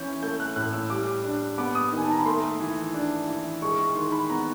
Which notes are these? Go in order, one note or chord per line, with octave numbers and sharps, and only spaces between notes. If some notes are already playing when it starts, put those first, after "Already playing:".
Already playing: E3 C#4 G6
A3 G6
F#6
A2 F#6
E6
G3 D6
D4
B3 D6
D#6
D#3
G#5
A5
A#5
B5
A3 C6
E3
D4
E3
G#3 C#6
C#6
D#3 C6
B5
B3 A#5